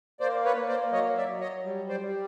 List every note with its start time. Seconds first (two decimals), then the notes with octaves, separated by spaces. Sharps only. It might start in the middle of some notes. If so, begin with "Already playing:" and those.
0.20 A#3 C5 D5
0.45 B4 C#5
0.57 A#3
0.68 C5 D5
0.92 F#3 C#5 D#5
1.17 D5 E5
1.29 F#3
1.40 C#5 D#5
1.64 G3
1.89 C5 D5
2.01 G3